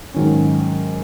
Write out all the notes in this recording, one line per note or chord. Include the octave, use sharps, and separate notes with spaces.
G#2 D#3 F#3 C#4